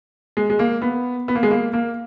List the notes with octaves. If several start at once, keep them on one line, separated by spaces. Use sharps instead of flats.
G#3
G#3
A#3
B3
B3
A#3
G#3
A#3
A#3